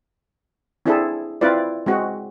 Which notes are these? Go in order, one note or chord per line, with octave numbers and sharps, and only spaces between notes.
C4 D4 E4 G#4 A4
C4 E4 F4 B4 D5
G#3 C4 F#4